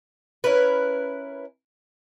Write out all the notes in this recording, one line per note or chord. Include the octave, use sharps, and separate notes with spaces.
C#4 E4 A#4 B4